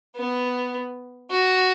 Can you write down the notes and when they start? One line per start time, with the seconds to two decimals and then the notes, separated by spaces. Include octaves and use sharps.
0.16 B3
1.30 F#4